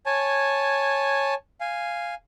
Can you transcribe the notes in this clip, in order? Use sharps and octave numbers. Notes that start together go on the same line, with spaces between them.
C#5 G#5 A5
F5 G#5